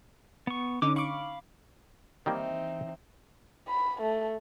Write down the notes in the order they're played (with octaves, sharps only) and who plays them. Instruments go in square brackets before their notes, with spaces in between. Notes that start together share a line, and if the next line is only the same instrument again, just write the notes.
[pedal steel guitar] B3 C#6
[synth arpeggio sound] D3 C#4 D#4 [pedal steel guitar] D6
[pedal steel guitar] F5 B5 [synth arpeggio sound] C#6 D6
[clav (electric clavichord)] D#3 G3 A#3 [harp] E3 [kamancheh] C4 D#4
[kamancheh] B5
A3